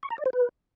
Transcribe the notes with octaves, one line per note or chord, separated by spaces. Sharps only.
C#6
A#5
D5
C5
B4